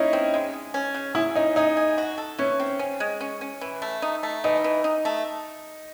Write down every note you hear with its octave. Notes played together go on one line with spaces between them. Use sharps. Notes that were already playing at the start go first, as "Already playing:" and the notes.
Already playing: C#4 D#4 E4
C4
G#3
G#3
C#4
C#3
E4 G#4
C#4 D#4
D#4 G#4
G#4
F#4
A4
E3 C#4
C4
C#4
G#3
C#4
C#4
E3
A3
D#4
A3
E3 D#4
E3
D#4
A3